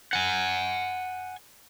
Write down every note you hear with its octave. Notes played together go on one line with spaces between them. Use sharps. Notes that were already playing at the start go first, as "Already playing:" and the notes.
F#5 G#5